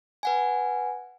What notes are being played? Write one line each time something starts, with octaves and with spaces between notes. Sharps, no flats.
B4 F#5 G#5